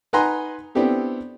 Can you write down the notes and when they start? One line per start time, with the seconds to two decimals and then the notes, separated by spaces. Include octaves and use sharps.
0.13 D#4 B4 F#5 G#5 A#5 C6
0.75 B3 C4 D4 E4 G4 A4